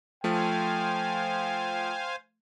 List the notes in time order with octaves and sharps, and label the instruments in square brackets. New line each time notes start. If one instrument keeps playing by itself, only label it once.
[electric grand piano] F3 A3 [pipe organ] C5 F5 G#5 [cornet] G5